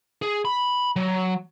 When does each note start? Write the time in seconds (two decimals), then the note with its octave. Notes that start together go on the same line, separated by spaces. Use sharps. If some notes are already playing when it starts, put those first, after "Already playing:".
0.22 G#4
0.45 B5
0.96 F#3